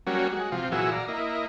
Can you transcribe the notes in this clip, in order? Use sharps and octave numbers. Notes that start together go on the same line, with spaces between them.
F#3 G3 A#3 C#4 F#4
G#3 F#4
C3 F3 F4
A#2 E3 F#3 F#4 G#4 E6
D5 F5 A#5
A#3 E4 D#5